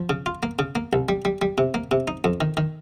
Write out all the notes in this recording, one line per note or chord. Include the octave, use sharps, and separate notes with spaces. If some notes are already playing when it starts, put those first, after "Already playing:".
Already playing: F3
C#3
F4
A#3
C#3
A#3
C2
G3
G3
G3
C3
A#3
C3
D#4
F2
D#3
D#3